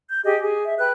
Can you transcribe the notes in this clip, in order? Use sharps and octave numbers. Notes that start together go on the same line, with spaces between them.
G6
G4 G#4 D#5
G#4
E5
B4 G5 F#6